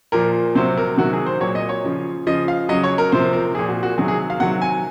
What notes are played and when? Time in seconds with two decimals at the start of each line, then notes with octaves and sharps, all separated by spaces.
0.12 A#2 F3 A#4
0.55 C3 F#3 C5
0.77 A#4
0.98 C3 D#3 F#3 F#4
1.13 G#4
1.26 C5
1.41 A#2 F#3 C#5
1.55 D#5
1.69 C#5
1.84 C#3 F3
2.26 C#3 F3 D#5
2.48 F5
2.69 C#3 F#3 D#5
2.83 C#5
2.98 A#4
3.12 C3 F3 C5
3.33 A#4
3.55 A#2 F3 G#4
3.69 F#4
3.83 F#4
3.98 C3 D#3 F#3 G#4
4.08 G#4
4.30 F5
4.40 C3 D#3 F#3 F#5
4.62 G#5